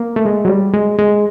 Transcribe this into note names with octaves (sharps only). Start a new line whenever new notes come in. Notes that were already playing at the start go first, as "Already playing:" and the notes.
Already playing: A#3
A3
G#3
F#3
G3
G#3
G#3